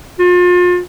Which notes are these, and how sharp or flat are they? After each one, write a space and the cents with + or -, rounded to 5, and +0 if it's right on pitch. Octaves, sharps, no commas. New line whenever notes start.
F4 +35